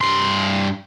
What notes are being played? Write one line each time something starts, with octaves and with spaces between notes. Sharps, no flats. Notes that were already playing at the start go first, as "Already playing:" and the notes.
G2 C6